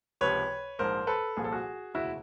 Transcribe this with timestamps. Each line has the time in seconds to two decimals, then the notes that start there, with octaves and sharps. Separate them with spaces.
0.21 C#2 C3 F3 B4 C#5
0.79 A#1 G#2 F3 A#4 C5
1.07 A4 B4
1.37 C2 A#2 F3 G#4
1.44 A4
1.52 F#4 G#4
1.94 E1 D2 C#3 E4 F#4